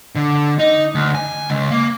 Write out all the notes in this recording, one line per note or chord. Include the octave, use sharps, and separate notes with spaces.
D3
D#4
D2
G#5
C#2
A#3